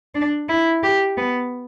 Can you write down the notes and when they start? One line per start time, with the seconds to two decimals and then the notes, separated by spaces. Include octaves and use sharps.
0.15 D4
0.49 E4
0.83 G4
1.17 B3